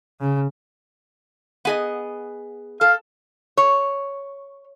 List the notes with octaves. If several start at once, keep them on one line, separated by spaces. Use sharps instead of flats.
C#3
B3 G#4 D#5
A4 F5
C#5